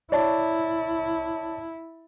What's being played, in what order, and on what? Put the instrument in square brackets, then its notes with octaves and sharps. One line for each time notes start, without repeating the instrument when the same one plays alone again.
[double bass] E4 [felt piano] C#5 D5 A5